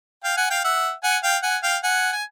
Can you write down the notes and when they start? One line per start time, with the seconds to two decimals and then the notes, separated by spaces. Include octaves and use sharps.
0.24 F5 G5
0.37 F#5 G#5
0.50 F5 G5
0.64 E5 F#5
1.04 F#5 G#5
1.23 F5 G5
1.43 F#5 G#5
1.63 F5 G5
1.83 F#5 G#5
2.12 G#5